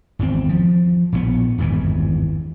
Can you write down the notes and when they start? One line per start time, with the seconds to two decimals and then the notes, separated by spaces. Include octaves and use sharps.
0.19 G#1 E2 C#3 C4
0.49 F3
1.12 A#1 A2 D#3 B3
1.58 G#1 E2 G2 E3